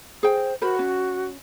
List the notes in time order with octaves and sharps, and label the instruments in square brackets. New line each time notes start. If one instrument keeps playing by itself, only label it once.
[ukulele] G#4 G5 [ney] C5
[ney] F#4 [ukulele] A#4 C5 B5
[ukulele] C#4